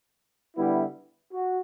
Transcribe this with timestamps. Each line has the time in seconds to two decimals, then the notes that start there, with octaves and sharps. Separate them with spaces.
0.57 D3 G3 B3 E4
1.33 F#4